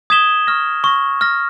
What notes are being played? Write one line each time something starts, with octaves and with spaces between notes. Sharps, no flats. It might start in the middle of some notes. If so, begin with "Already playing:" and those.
D#6 G#6 B6 E7 G7
C#6 F6 A#6
C#6 F6 A#6
C#6 F6 A#6